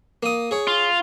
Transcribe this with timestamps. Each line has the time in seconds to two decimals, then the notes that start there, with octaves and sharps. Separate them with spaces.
0.23 A#3 D#6
0.51 G#4 C#5
0.67 F4